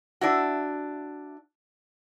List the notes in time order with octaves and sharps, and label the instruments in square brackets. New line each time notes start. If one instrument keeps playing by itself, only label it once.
[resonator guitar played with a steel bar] D4 E4 F#4